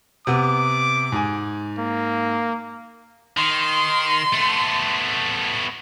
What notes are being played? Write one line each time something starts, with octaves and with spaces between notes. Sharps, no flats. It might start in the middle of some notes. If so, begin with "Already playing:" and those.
C3 B3 D6
G#2 G#5
A#3
D#3 C6
A3 B3